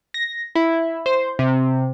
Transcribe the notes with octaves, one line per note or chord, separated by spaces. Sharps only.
A#6
E4
C5
C3